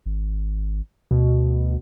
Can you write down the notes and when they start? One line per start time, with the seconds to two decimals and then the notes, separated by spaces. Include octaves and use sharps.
0.06 G#1
1.11 D2 B2